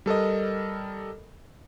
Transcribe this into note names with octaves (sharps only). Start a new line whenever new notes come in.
G3 A4 A#4 D#5